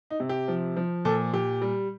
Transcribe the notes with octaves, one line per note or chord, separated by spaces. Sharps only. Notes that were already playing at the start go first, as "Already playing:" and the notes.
D#4
C3
G4
F3
F3
A#2 A4
A#2 G4
G3